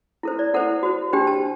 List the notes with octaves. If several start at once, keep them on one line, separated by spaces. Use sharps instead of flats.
E4 A4 C5
D5
E4 A4 C5 F#5
F#4 C5
D4 G4 C5 G5
A5